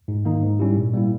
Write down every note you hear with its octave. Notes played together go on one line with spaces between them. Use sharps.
G#2
D#3 A#3 D#4
G#2
G3 C#4 E4 G4
A#2
G3 A#3 E4